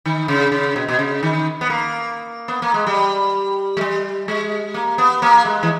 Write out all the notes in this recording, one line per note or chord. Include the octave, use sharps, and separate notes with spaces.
D#3
C#3
C#3
B2
B2
C#3
D#3
B3
A#3
B3
A#3
G#3
G3
G#3
G3
G#3
A#3
B3
A#3
G#3
E3